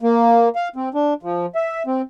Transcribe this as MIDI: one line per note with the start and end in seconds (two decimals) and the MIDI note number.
0.01 0.49 58
0.55 0.69 77
0.76 0.89 60
0.94 1.14 62
1.23 1.46 53
1.55 1.83 76
1.87 2.02 60